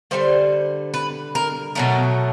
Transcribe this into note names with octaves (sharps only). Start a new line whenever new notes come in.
D3 G3 A#3 C5
B4
A#4
B2 F#3 A3 A#4